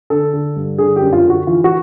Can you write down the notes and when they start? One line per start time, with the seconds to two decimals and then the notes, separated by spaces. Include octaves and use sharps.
0.10 D3 A4
0.33 D3
0.56 G2
0.78 D3 G#4
0.96 G4
1.02 F#2
1.13 F4
1.25 D3
1.30 F#4
1.47 E3 F4
1.64 F#4